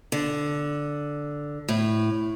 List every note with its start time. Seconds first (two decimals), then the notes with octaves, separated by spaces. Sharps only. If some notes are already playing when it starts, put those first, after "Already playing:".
0.12 D3
1.68 A2